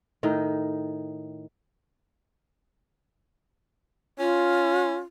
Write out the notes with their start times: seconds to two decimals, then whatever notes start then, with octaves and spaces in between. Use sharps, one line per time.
0.23 A2 D#3 D#4
4.19 C#4 F4